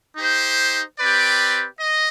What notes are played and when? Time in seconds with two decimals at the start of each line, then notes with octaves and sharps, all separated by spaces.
0.16 D#4 G4 C5
0.99 C4 G4 B4 D5
1.80 D#5